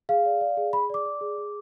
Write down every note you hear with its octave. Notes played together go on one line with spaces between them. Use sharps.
G#4 F5
D5
D5
G#4
G#4 B5
D5 D6
D5
G#4
G#4